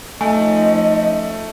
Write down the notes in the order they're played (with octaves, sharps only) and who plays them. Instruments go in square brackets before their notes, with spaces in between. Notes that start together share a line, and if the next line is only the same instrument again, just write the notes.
[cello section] F3 C#4 D#4 [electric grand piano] A3 [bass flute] D#5 [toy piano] G#5